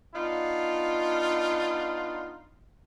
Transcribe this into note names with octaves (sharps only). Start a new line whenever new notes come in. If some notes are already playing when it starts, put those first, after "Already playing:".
B3 D4 D#4 F4